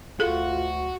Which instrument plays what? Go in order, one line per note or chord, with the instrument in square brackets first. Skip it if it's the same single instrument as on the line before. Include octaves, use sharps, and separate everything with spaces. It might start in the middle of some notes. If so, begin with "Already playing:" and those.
[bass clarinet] D2 [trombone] F4 [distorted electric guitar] F#4 [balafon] G#4 A4